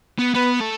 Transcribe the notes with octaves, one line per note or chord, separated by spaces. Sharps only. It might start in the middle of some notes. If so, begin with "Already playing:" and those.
B3
B3 B4
A3